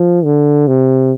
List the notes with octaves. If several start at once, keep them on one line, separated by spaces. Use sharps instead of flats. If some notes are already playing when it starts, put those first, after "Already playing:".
Already playing: F3
D3
C3